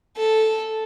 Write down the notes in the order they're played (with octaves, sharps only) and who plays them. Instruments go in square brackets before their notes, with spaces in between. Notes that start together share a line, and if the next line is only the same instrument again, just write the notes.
[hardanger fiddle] A4